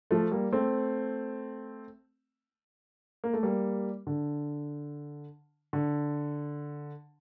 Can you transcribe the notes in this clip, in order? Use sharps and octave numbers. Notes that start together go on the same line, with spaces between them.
F3 A3
G3 A#3
A3 C4
A#3
A3
G3 A#3
D3
D3